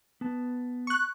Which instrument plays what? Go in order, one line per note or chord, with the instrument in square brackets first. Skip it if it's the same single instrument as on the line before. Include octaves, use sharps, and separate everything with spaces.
[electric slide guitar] B3 A5
[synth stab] C#6 F#6